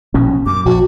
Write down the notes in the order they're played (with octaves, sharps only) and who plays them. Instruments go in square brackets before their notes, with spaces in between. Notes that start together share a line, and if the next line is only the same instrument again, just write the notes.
[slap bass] A#1 B2 C#4
[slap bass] F#2 [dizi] D6
[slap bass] A#1 [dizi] F#4